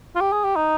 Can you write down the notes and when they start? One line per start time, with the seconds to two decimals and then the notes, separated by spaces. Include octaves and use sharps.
0.15 F4
0.21 G4
0.32 G#4
0.44 G4
0.56 D#4